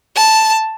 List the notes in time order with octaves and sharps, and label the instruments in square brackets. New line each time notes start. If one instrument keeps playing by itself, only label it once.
[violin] A5